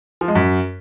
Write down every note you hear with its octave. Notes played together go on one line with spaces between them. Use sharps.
F3
G#3
F#2